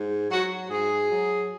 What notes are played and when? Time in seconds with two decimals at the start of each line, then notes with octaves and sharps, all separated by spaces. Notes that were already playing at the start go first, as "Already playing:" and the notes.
Already playing: G#2
0.31 F#3 F#4
0.69 G#2 G#4
1.10 F#3